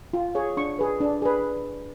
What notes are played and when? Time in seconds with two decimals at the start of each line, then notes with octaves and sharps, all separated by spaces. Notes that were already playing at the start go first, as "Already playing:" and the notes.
0.13 F4
0.35 G#4 C#5
0.57 D4 C#6
0.79 G#4 B4
1.00 D4
1.22 G#4 B4